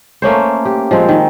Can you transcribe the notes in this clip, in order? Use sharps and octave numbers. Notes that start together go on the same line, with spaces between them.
A3 A#3 C#4 C5
G4
F3 G#3 C4
D#3